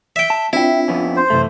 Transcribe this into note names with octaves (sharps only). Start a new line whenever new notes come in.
E5 G5
A5
C4 D4 E4 F4 E5 G5
F2 B3 C#4
C5
F#2 C3 E3 A3